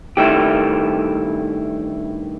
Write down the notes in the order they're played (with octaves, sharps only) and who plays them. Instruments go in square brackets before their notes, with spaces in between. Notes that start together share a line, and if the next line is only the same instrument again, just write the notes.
[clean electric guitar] G2 D#3 A3 E4 G4